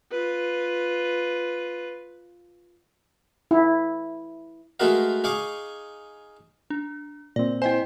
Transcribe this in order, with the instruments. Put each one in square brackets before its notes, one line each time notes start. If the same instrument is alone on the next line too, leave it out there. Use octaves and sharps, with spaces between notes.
[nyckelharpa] F4 B4
[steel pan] E4
[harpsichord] G#3 A3 D#4 F#4 A#4 F5
D#4 G#4 F5 C#6 D6
[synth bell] D4
[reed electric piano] A#2 C4 [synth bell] D5
[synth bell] E4 D#5 G#5 [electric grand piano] C5 G5